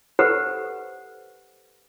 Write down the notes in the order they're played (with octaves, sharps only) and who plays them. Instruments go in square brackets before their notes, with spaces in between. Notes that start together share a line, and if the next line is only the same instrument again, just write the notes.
[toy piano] G4 A4 B4 C5 F#5